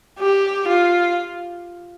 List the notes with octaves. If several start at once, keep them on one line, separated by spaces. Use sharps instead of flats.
G4
F4